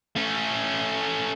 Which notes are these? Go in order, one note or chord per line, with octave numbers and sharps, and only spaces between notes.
A3 C#4